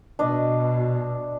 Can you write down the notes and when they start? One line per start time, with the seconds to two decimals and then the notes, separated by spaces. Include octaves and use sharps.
0.19 B2 D4 D5 D#5